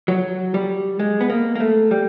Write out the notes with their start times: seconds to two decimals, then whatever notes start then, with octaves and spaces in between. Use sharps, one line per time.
0.08 F#3
0.54 G3
0.99 G#3
1.21 B3
1.30 A#3
1.55 A#3
1.60 A3
1.91 G3